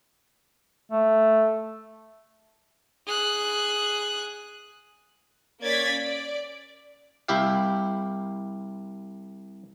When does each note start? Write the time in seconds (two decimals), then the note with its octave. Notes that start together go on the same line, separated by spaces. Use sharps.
0.92 A3
3.07 G#4 F#6
5.62 A#3 C#4 D5 G#6 A6 B6
6.04 D5
7.28 C2 E4 G4 F5